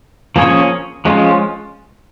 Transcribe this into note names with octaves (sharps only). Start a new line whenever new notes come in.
F3 A#3 C#4 G#4 C#5
F3 G#3 C#4 F4